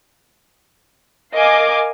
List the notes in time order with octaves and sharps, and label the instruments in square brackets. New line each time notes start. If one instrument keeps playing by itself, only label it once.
[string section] A#4 D#5 F5 G#5 D6